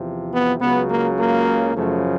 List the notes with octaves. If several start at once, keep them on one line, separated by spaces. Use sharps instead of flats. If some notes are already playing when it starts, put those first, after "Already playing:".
Already playing: E2 C3 F3
B3
C#2 C#3 F#3 B3
A#3
A#3
F#2 C#3 F3 A3